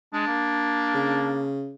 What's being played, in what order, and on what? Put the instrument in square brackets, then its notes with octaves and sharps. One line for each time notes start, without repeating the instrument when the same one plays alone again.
[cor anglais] G#3 [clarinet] D4
[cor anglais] A#3
[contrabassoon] C#3